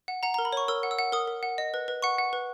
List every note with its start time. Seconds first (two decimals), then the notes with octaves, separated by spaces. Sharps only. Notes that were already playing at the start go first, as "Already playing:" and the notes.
0.08 F#5
0.23 F#5 A#5
0.34 A#4 A#5
0.45 B5
0.53 C#5 C#6
0.68 A#4 E6
0.83 F#5
0.91 E6
0.99 F#5
1.12 A#4 D#6
1.27 A#4
1.43 F#5
1.58 D#5
1.74 B4
1.88 B4
2.02 F#5 C#6
2.18 F#5
2.33 B4